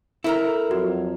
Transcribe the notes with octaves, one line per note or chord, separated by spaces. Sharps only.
E4 A4 A#4 A#5
F2 F#3 F#4